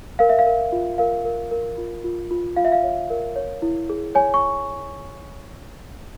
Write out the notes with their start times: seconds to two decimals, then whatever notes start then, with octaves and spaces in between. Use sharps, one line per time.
0.19 A#4 F5
0.29 E5
0.39 F5
0.46 A#4
0.72 F4
0.98 A#4 F5
1.25 A#4
1.51 A#4
1.78 F4
2.04 F4
2.31 F4
2.56 F4 F5
2.65 E5
2.72 F5
2.83 C#5
3.10 A#4
3.36 C#5
3.62 E4
3.89 G#4
4.15 C#5 G#5
4.34 C#6